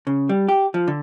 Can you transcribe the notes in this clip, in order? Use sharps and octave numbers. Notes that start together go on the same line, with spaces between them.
C#3
G3
G4
F3
D3